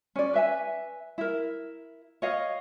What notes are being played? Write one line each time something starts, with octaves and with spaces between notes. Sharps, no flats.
C#4 D5
B4 E5 G#5
E4 A#4
C#5 D#5 F5